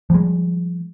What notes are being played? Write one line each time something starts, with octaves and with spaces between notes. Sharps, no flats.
F3 G3 G#3